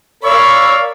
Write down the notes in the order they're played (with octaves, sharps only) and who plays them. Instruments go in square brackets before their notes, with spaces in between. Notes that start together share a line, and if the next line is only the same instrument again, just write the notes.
[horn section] A#4 D5 F5 [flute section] C#5 C#6 E6 [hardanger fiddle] B5